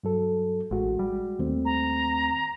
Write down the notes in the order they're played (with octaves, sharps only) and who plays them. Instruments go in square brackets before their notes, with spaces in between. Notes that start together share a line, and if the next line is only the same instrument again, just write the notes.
[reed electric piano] G2 F#3 A4
[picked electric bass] A1 [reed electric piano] G#3 F#4
[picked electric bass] G3
[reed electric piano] D#2 A3 C4
[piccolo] A#5